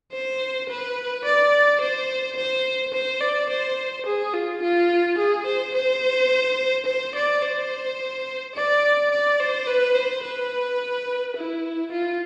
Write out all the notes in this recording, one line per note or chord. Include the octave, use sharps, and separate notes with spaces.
C5
B4
D5
C5
C5
C5
D5
C5
G#4
F4
F4
G#4
C5
C5
C5
D5
C5
D5
D5
C5
B4
C5
B4
E4
F4